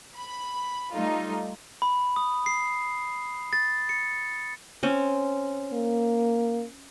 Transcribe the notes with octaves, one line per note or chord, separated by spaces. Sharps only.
B5
G3 A3 D#4 F4
B5
D#6
C7
A6
C#7
C4 C#4
A#3